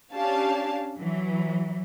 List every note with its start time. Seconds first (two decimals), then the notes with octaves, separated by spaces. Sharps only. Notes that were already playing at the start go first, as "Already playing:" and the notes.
0.14 C#4 D4 G4 F5 A5
0.96 E3 F#3